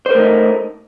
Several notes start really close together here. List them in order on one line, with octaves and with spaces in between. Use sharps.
C5 A#4 A3 D#4